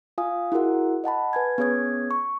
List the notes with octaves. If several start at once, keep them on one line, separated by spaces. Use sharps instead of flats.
F4 F5 G#5 D#6
E4 F#4 G#4 A#4 F#5
D#5 F#5 A5 B5
B4 G#5 G#6
B3 C#4 G#4 C#5 D#6 G#6
C#6